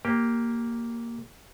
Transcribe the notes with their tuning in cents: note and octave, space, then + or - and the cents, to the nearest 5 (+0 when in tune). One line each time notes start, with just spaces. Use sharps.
A#3 +0 G4 +0